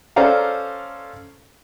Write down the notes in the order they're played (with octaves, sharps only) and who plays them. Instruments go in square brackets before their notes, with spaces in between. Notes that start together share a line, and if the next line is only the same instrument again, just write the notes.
[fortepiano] C#4 A4 C5 D5 F5 A#5